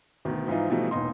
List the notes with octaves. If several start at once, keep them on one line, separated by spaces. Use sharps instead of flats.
D2 B2 D#3
G#2 E3 F3 D#4 F4
B2 E3 F3 G3 A3 D#4
E1 A#2 B3 D#4 C6